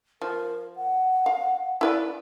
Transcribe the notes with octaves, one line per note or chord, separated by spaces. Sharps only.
F3 A#4
F#5
F5
E4 B4 D5